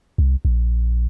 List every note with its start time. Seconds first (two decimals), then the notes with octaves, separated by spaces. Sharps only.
0.18 C2
0.45 A#1